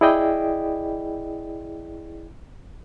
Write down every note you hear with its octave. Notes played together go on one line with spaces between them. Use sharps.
E4 G#4 D5 D#5 G5